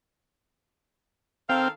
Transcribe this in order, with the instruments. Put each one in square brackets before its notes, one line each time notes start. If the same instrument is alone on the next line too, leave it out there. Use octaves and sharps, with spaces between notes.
[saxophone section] D#3 A4 F5 [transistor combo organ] C4 G5